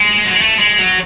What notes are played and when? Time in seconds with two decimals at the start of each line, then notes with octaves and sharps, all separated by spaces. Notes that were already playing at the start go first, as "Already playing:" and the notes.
Already playing: G#3
0.26 F#3
0.33 G#3
0.41 A3
0.59 G#3
0.78 F#3